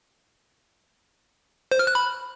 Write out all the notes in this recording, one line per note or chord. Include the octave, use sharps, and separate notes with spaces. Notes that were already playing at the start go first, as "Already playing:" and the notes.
C5
F6
F#6
B5